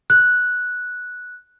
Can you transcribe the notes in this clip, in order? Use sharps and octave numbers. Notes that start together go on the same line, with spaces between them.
F#6